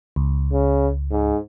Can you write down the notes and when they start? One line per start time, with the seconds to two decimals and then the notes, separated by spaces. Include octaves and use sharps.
0.16 C#2
0.52 C#3
1.11 G#2